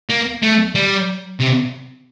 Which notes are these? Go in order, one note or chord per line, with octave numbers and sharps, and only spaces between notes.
A#3
A3
G3
C3